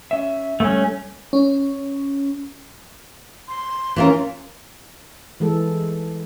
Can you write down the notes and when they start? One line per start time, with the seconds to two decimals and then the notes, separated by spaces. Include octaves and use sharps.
0.11 C#4 E5
0.60 G3 A3 C#4
1.33 C#4
3.48 C6
3.96 E3 C#4 F4 A#4
5.40 E3 G#3 A4